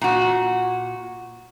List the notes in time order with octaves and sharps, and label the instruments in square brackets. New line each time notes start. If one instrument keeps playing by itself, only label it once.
[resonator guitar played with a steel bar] A#2 F#4